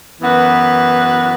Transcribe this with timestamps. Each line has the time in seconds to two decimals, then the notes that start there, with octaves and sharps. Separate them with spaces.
0.21 F#2 E3 B3 F#4 B4